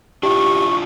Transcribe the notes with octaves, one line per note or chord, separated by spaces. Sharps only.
D4 E4 F4 G4 C#6